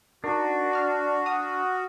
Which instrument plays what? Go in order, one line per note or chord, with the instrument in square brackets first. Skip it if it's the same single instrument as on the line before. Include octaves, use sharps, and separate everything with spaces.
[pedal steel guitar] D4 [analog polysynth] D#4 A#4 [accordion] F#4
[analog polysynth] D5 F6
[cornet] F#5 [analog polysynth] D#6 F6